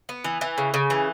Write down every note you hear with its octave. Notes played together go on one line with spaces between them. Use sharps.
B3
E3
E3
C#3
C#3
E3